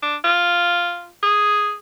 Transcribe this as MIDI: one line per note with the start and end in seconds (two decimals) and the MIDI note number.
0.03 0.17 62
0.25 1.10 65
1.23 1.74 68